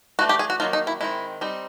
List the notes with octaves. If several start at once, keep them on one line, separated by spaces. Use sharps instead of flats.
E3 A3 D4 F#4
G4
G#4
F#4
D#3 F#3 A#3 D#4 F4
D#4
E4
D#3 G#3 C4 E4
G3 C4 D#4